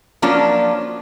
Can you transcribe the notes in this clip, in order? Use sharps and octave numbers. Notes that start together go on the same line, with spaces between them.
F3 F#3 A#3 C#4 D4 F4